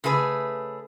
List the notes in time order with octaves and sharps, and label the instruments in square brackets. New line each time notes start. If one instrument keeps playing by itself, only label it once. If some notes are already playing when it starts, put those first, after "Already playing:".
[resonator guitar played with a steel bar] C#3 A3 G#4 B4